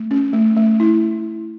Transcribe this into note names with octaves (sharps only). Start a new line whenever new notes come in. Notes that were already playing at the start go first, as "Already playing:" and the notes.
Already playing: A3
C#4
A3
A3
E4